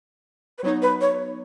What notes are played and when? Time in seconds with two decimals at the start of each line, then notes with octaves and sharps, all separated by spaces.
0.58 B4
0.63 F#3 B3 D#4 C#5
0.82 B4
1.01 C#5